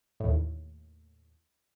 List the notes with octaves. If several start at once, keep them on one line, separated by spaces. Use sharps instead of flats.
D#2 A2